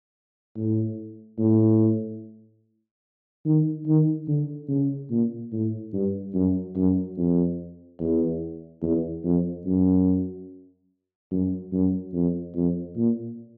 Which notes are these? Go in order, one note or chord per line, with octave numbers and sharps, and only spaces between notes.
A2
A2
D#3
D#3
D3
C#3
A#2
A2
G2
F#2
F#2
F2
E2
E2
F2
F#2
F#2
F#2
F2
F2
A#2